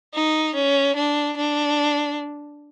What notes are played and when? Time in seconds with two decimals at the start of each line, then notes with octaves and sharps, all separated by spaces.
0.14 D#4
0.55 C#4
0.96 D4
1.37 D4